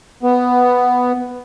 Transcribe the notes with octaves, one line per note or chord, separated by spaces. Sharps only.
B3